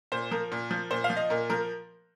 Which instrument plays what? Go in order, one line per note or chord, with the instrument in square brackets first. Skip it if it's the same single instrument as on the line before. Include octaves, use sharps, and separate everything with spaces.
[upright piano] A#2 C5
F3 A#4
A#2
F3
A#2 C5
F5
F3
D#5
A#2 A#4
F3 A#4